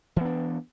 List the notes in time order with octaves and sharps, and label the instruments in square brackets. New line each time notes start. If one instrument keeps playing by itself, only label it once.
[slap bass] E3
B3
D4